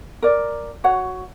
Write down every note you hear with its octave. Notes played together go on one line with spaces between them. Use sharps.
A#4 D5
F#4 C#5 F#5